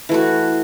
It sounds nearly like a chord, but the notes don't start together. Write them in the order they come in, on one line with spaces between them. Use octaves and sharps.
E3 A3 F#4